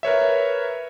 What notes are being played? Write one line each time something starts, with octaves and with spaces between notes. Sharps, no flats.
A#4 B4 C#5 E5